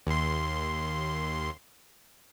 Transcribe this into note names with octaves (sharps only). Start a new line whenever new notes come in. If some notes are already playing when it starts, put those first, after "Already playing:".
D#2 C6